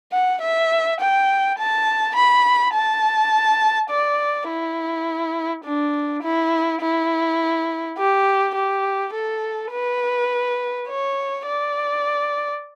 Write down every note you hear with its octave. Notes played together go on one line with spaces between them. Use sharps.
F#5
E5
G5
A5
B5
A5
D5
E4
D4
E4
E4
G4
G4
A4
B4
C#5
D5